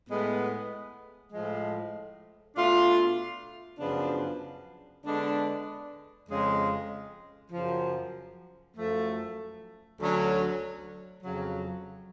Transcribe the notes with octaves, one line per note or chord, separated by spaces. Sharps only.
A2 G#3 B3
A2 F3 G#3
B2 A3 D4 F4
F#2 C#3 F3 B3 D4
D3 G#3 B3 D4
F2 C#3 G#3
F#2 C#3 F3
F#2 F3 A3
D2 D3 F#3 C#4
F2 C#3 F#3